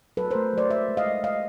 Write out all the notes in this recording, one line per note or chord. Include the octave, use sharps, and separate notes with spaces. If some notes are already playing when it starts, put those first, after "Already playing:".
F#3 A4 B4
A#4 C5
A3
F#3 C5 D5
G#3 D5 E5
G#3
D#5 F5
G#3
G#3 D#5 F5